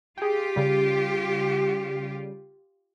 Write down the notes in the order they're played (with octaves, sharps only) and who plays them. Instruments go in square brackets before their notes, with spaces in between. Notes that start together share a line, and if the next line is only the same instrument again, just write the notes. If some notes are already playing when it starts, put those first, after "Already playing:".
[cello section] F4 G4 [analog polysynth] G#4 G5
[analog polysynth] C#3 G3